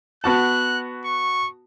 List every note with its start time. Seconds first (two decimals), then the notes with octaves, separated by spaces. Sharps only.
0.24 B3 F#4 A5 F#6
1.05 C#6